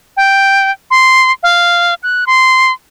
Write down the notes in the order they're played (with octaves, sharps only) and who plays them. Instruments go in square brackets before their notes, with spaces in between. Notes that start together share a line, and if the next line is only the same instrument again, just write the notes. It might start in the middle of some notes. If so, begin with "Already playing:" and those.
[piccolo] G5
C6
F5
F#6
C6